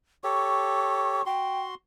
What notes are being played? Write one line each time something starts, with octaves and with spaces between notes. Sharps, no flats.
G4 A4 C#5 C#6
F#4 G5 C6